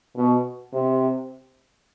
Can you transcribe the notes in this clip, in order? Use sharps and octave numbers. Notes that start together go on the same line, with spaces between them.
B2
C3